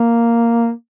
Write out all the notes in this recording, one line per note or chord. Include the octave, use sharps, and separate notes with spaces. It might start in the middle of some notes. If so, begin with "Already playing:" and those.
Already playing: A#3